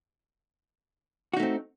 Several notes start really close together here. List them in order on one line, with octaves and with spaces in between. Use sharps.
F#4 D#4 A3 C4